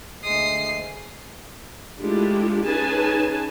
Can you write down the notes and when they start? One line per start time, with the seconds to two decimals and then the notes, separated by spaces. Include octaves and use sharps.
0.24 D2 G#3 D#6 C7
2.01 G#3 A3 D4 E4 F4 G4
2.66 C#4 D#4 G#4 B4 G#5 A5